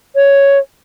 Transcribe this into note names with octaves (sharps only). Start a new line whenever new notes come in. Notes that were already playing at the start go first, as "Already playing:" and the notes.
C#5